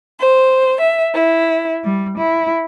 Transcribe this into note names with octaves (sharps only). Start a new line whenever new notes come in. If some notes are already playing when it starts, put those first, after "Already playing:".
C5
E5
E4
G3
E4